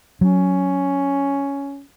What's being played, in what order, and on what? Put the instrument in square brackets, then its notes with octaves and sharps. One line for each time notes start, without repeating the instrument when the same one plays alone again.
[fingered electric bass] F#3 [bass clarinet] C#4